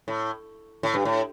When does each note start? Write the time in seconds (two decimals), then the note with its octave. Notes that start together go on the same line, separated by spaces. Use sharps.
0.08 A2
0.83 A2
0.94 G2
1.05 A2